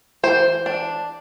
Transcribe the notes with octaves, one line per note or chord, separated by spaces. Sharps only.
E3 C5
D4